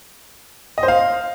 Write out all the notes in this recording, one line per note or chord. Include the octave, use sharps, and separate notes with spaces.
D#5
C5
F5